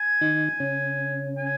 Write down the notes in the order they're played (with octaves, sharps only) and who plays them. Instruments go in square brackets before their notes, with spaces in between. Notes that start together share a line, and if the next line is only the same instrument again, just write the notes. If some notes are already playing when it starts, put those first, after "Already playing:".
Already playing: [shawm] G#5
[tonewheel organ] D#3 D#4
C#3 C#4
[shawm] G#5